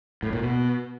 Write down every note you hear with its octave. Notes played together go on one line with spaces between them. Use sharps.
A2
A#2
B2